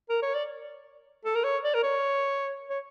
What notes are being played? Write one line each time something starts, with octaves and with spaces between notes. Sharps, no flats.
A#4
C#5
D5
A4
A#4
C#5
D5
A#4
C#5
C#5